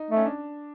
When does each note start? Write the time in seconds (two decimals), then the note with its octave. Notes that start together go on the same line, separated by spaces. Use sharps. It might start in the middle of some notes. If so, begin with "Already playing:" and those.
Already playing: D#4
0.10 A3
0.16 C#4
0.26 D4